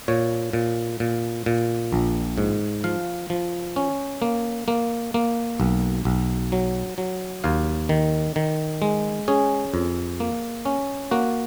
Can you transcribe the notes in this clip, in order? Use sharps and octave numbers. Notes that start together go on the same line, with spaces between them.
A#2 C#5
A#2
A#2
A#2
A#1
G#2
F3 F5
F3
C#4
A#3
A#3
A#3
B1
B1
F#3
F#3
D#2 F5
D#3
D#3
G#3
C#4 G#4
F2
A#3
C#4
A#3 F#4